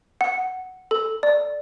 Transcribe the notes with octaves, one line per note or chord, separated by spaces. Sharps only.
F#5
A4
D5